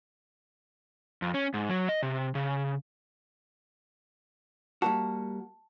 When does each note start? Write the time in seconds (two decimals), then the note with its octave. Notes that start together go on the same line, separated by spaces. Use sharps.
1.22 F2
1.34 C#4
1.54 G#2
1.70 F#3
1.89 D#5
2.03 C3
2.35 C#3
4.82 G3 A#3 F#4 A5